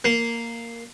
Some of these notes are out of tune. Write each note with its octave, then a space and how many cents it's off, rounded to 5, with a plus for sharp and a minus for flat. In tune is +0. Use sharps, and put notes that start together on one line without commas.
A#3 -5